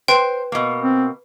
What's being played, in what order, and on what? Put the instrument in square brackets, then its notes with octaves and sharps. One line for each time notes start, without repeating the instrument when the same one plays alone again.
[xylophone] B4 G5 [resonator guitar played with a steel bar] C5
[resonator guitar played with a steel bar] B2 A#3
[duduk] C4